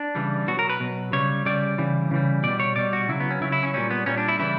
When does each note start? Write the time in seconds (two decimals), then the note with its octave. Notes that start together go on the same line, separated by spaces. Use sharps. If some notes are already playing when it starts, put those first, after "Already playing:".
Already playing: D4
0.15 C#3 E3 G3
0.48 B2 F#3 F#4
0.59 A#4
0.70 B4
0.80 B2 F#3
1.13 C#3 G3 C#5
1.45 C#3 G3 D5
1.78 C#3 E3 G3
2.11 C#3 E3 G3
2.44 B2 G3 D5
2.60 C#5
2.76 B2 G3 D5
2.93 F#4
3.08 C#3 F#3 E4
3.20 B3
3.31 C#4
3.41 C#3 F#3 E4
3.52 E4
3.63 C#4
3.74 A#2 G3 C#4
3.90 B3
4.06 A#2 G3 C#4
4.18 D4
4.28 E4
4.39 C#3 E3 G3 E4